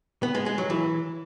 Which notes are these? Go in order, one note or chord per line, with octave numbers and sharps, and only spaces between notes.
B3
G#3
G#3
F#3
E3